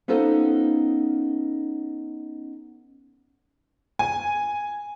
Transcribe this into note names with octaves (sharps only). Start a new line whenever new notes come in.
B3 C#4 D#4 F4 A4 C5
G#5